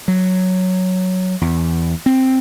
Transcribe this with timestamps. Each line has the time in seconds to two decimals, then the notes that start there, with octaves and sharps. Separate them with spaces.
0.08 F#3
1.41 E2
2.06 C4